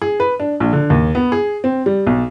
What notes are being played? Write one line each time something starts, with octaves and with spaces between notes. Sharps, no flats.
G#4
B4
D4
A#1
D3
D#2
B3
G#4
C4
G3
B1